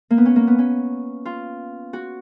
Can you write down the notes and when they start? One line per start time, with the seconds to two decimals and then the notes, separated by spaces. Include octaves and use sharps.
0.11 A#3
0.18 B3
0.26 C#4
0.36 A#3
0.47 B3
0.58 C#4
1.26 F4
1.93 F#4